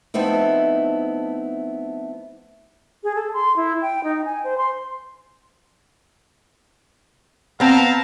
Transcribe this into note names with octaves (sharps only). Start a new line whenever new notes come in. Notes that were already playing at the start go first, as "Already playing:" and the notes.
F3 A3 B3 C4 D#4 E4
G#4
A4
C6
E4
G5
D#4
G#5
C5
C6
B3 C4 F5 A5 A#5